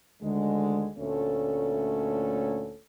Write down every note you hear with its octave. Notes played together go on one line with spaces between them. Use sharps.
D2 D3 D#3 G#3
D2 A#2 A3 C#4 A4 C#5